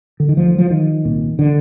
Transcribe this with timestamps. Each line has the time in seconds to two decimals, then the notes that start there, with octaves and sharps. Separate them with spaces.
0.20 D3
0.29 D#3
0.37 D2 D3 F3
0.58 F3
0.71 D#3
1.05 C2 A#2
1.39 D3